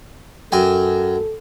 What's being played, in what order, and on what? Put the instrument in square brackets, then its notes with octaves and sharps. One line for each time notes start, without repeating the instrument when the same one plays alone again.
[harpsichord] F#2 G5 G#5 [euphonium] A4